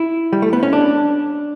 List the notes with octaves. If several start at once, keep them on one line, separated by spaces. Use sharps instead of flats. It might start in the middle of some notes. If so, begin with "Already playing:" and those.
Already playing: E4
G3
A3
B3
C#4
D4